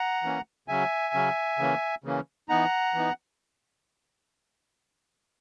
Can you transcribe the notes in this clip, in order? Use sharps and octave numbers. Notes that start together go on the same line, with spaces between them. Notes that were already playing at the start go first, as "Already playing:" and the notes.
Already playing: F#5 A#5
E3 A#3 C#4
C#3 F#3 C#4 E5 G#5
C#3 F#3 C#4
C#3 E3 A#3 C#4
C#3 E3 A#3 C#4
E3 B3 D#4 F#5 A#5
E3 B3 D#4